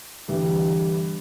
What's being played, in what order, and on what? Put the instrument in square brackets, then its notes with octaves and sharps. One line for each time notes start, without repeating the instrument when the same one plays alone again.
[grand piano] G1 G2 E3 G3